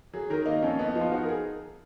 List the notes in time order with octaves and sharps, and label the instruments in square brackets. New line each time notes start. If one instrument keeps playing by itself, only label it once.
[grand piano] F#3 [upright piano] G#4
[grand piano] D#3 [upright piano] A#4
[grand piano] A#3 [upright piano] D#4
[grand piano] F2 [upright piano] C#4
[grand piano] B3 [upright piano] D#4
[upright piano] D#4
[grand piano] F3
[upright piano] F4
[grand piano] D#4 [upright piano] F#4
[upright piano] A#4
G#4